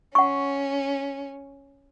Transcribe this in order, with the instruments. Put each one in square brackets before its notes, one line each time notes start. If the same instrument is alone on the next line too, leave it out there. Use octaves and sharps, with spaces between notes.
[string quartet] C#4 [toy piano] F#5 C#6